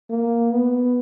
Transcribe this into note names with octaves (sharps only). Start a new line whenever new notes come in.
A#3
B3